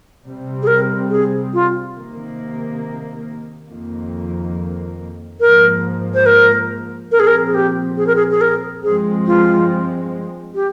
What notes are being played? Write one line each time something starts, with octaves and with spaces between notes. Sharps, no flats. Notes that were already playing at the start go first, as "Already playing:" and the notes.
C3 G3 C4
G#4
A#4
G#4
F4
C3 D#3 A#3
F2 D#3 A#3
G#2 F3 A#3 A#4
C5
A#4
A#2 F3 C4 A#4
G#4
A#4
G#4
G4
G#4
A#4
G#4
G#4
A#4
G2 F3 G#3 C4 G#4
F4
G4